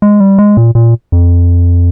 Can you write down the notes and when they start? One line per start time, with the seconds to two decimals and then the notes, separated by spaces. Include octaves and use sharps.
0.02 G#3
0.20 G3
0.39 G#3
0.57 A#2
0.75 A#2
1.12 F2